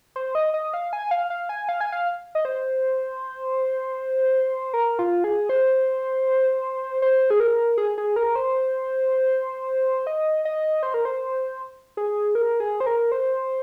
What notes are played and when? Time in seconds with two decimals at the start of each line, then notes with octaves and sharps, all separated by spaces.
0.16 C5
0.35 D#5
0.54 D#5
0.74 F5
0.93 G#5
1.11 F5
1.30 F5
1.49 G#5
1.69 F5
1.81 G#5
1.92 F5
2.35 D#5
2.45 C5
4.74 A#4
4.99 F4
5.24 G#4
5.49 C5
7.02 C5
7.30 G#4
7.40 A#4
7.77 G#4
7.98 G#4
8.16 A#4
8.35 C5
10.07 D#5
10.45 D#5
10.83 C5
10.94 A#4
11.05 C5
11.97 G#4
12.35 A#4
12.60 G#4
12.80 C5
12.86 A#4
13.12 C5